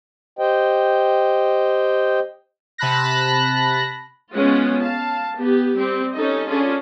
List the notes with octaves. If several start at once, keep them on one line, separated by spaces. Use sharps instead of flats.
G4 C5 D#5 G5
C3 A5 B5 F#6 A#6
G#3 B3 C#4 F4 F#5
F5 A5
B3 G4
G3 C4 G4
C#4 D#4 A4 D#5
C#4 D4 F4 G#4 A4